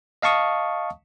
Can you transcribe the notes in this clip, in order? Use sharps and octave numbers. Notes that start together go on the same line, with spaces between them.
D#5 F5 A5 C#6 D#6